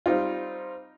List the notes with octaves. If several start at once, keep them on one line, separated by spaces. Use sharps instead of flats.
G3 C4 D#4 F4